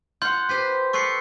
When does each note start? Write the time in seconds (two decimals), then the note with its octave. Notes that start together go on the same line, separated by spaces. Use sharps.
0.22 F4 F#5 C6 G6
0.49 G4 B4 C5
0.93 A4 B4 D5 C#6 C7 C#7